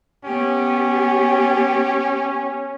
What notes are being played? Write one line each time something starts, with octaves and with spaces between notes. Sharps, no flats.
B3 C#4 G4